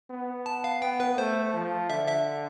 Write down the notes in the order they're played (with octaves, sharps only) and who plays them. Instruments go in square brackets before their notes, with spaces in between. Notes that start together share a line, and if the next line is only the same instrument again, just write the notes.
[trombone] B3
[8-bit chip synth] A5
F5
[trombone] B3 [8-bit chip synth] G5
[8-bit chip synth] B4
[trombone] A3 [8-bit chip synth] C5
[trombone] F3
[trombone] D3 [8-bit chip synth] E5
[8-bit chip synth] E5